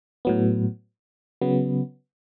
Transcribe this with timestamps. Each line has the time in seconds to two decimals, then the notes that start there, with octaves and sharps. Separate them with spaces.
0.25 A2 F#3 B3
1.41 C#3 F#3 B3